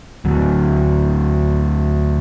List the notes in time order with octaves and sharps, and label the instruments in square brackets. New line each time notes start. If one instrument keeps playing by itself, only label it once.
[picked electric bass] D2 F#3